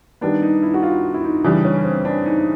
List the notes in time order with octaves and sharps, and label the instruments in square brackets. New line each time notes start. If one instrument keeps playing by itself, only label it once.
[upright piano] D#3 G3 B3 [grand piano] D4
[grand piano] D#4
E4
F#4
F4
E4
D#4
[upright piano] C#3 E3 G3 [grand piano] D4
[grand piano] C#4
C4
D4
D#4